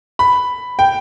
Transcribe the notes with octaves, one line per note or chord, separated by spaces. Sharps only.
B5
G5